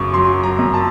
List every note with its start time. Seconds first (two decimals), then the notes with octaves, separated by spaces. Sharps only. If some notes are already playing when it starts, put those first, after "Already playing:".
Already playing: F#2 C#3 C#6 D6
0.13 F#3 C6
0.43 A#5
0.59 F#2
0.74 A5